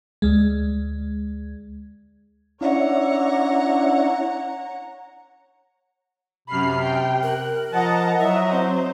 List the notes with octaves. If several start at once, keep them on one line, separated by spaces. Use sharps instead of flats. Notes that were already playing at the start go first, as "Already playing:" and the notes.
D2 G#3
C#4 D4 E4 C#5 F#5 A#5
F#2 C3 B5 F6 C7
G5
A#4 F#6
F3 D#5 F#5 A5 A#5
F#3 E4 E5
C4 C5